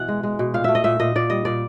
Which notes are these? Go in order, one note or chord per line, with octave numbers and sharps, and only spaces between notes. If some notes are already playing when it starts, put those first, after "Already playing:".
Already playing: B2 E3 F#5
G#3
G#3
B2
A#2 F5
A3 E5
D#5
A#2 E5
A#2 D#5
A#2 D5
G3 D#5
A#2 D5